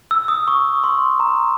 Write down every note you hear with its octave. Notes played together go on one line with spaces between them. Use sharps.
E6
D#6
C#6
C6
A#5